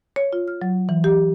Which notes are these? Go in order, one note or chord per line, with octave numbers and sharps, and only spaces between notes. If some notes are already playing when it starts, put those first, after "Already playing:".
C#5
F4
F6
F#3
E3
G4